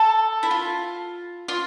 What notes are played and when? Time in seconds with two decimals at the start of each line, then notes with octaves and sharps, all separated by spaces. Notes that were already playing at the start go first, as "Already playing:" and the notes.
Already playing: A4
0.43 E4
0.51 F4
1.48 F4